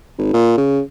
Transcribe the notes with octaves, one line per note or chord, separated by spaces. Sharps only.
G#1
A#2
C#3